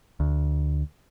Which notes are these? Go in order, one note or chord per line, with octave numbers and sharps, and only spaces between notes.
D2